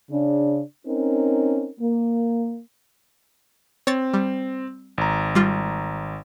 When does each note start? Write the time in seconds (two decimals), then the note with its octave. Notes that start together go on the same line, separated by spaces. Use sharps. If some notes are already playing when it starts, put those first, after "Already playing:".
0.10 C#3 D4
0.86 C4 C#4 D#4 A#4
1.80 A#3
3.87 C4 C#5 A6
4.14 G3
4.98 G#1 A#5
5.35 G3 F4